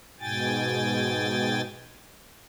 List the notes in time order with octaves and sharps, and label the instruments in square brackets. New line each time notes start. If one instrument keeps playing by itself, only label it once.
[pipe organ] G#2 B2 G5 G#5 A6